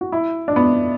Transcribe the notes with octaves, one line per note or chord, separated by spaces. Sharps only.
F#4
E4
D4
B3